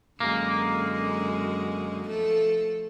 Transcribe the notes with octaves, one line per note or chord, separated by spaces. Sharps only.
F#2 D3 G#3 A#3
F3 A3 A4